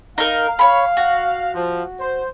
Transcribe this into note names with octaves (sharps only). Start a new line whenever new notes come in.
D#4 A#4 F5
C#5 B5
F#4
F3
C5